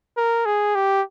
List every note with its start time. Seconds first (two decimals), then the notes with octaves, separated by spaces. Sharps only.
0.17 A#4
0.46 G#4
0.75 G4